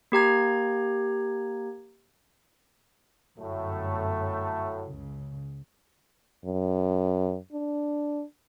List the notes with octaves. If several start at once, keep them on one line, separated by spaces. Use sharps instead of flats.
A#3 G4 A#5 G#6
G1 F#2 A2 F#3 A3
C#2 C#3
F#2
D4